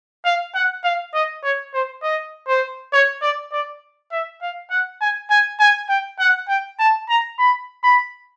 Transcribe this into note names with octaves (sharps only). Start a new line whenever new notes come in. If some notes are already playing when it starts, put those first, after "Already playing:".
F5
F#5
F5
D#5
C#5
C5
D#5
C5
C#5
D5
D5
E5
F5
F#5
G#5
G#5
G#5
G5
F#5
G5
A5
A#5
B5
B5